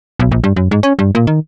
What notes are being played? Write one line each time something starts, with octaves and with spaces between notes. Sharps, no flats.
B1
A#1
G2
F#2
G#2
C#4
G2
A#2
D#3